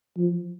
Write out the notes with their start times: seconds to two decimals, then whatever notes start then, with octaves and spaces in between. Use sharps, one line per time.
0.17 F3